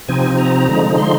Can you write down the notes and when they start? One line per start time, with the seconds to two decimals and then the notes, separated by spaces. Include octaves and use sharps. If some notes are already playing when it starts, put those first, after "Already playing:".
0.08 C3 F3 C4 D#4 G#5
0.38 A#5
0.69 D3 F3 G#3 D#4
0.98 C6